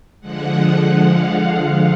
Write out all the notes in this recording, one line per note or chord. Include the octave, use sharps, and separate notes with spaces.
D3 F3 G#3 F#5
F5